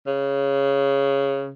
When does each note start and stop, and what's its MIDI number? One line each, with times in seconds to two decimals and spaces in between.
0.07 1.52 49